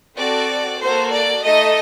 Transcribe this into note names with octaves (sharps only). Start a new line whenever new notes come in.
C4 F#4 A4 D5
A#3 F#4 A4 C5
D5
A3 D#4 A4 D#5